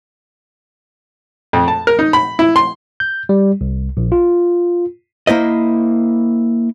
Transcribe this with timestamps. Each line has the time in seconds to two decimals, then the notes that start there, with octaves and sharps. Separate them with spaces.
1.53 F2
1.68 A5
1.87 A#4
1.99 D#4
2.13 B5
2.39 E4
2.56 C6
3.00 G6
3.29 G3
3.61 C2
3.97 A#1
4.12 F4
5.27 A#3 E4 C5 D#5